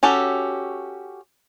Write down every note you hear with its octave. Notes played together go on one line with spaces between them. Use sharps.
C#4 F#4 G4 A4